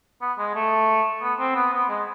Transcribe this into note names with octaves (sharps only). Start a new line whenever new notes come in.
B3
G#3
A3
B3
C4
B3
B3
G#3